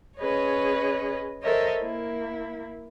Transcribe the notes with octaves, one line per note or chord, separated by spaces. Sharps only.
C#4 G#4 B4 C#5 D#5
A4 A#4 C5 C#5 D#5 E5
A#3 E4